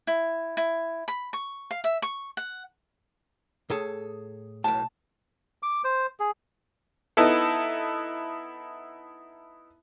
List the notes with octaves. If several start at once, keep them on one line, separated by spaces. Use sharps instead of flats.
E4
E4
B5
C#6
F5
E5
C#6
F#5
A2 G#4 A4
B1 A2 A5
D6
C5
G#4
B3 D#4 E4 A4